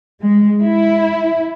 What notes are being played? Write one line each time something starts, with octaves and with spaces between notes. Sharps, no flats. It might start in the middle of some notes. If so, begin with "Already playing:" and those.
G#3
E4